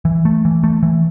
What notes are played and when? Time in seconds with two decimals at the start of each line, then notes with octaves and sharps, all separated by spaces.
0.05 E3
0.25 A3
0.45 E3
0.64 A3
0.83 E3